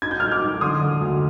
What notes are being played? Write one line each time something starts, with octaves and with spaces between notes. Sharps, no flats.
D#4 G#6
G6
D#4 F6 G#6
D6 F6
D#4
D3 C6 D#6
D3
D2